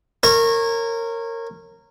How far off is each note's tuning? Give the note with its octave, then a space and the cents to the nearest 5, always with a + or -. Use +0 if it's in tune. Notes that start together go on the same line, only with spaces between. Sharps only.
A#4 -20 C#5 -25